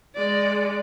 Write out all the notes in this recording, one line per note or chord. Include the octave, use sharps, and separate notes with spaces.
G#3 D5